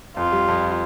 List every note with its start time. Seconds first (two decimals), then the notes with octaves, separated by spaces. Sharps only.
0.17 F2 F4
0.32 G3
0.48 F2